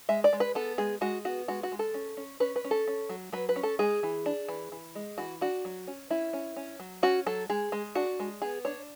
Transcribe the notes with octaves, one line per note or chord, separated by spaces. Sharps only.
G#3 E5
D5
G#3
B4
B3 A4
G#3 G#4
G#3 F#4
B3 F#4
G#3 F#4
F#4
G#3
A4
C#4
C#4
C#4 B4
B4
C#4
A4
C#4
F#3
F#3 B4
B4
C#4
A4
G#3 G#4
E3
D4
E3
E3
G#3
E3 F#4
D4 F#4
F#3
C#4
C#4 E4
C#4
C#4
F#3
C#4 F#4
F#3 A4
G#3 G#4
G#3
D4 F#4
G#3
B3 G#4
D4 C#5